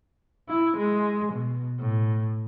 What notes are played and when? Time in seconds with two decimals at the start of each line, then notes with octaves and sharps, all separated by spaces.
0.49 E4
0.77 G#3
1.33 B2
1.80 A2